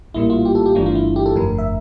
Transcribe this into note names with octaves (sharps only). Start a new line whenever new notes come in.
A#1 A2 G3 A#3 E4
F4
G4
A4
G4
G1 G2 E3 A3 D4 F4
F4
E4
G4
A4
G1 F2 D3 A3 A#4
E5